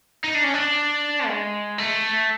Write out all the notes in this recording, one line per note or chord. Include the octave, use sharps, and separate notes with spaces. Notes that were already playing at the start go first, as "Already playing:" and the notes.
D#4
D4
C#4
D4
G#3
A3